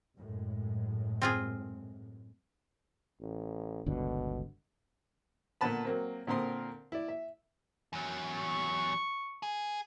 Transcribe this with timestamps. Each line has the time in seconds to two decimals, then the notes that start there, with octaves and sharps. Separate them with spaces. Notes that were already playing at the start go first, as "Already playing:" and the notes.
0.16 F#2 A2 G#3
1.22 C4 F4 G#4
3.21 A1
3.86 G1 C#2 B2 D3
5.61 A#2 D3 B3 B4 A5 B5
5.85 F#3 A#3 C4
6.27 A#2 D3 C4 A#4 C6 D#6
6.92 E4 D5
7.08 E5
7.93 E2 F#3
8.25 C#6
9.43 G#4